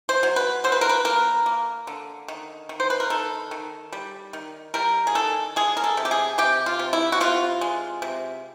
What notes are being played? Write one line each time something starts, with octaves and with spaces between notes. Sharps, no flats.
C5
F#3
B4
D3 C5
B4
A#4
B4
A#3 A#4
A#3
D3
D#3
D#3
C5
B4
A#4
D#3 A4
D#3
G3
D#3
G3 A#4
G#4
D#3 A4
G#3 G#4
A#4
A4
C3
G4
G#4
C3 G4
F4
C3
E4
F#4
C3 F4
G#3
C3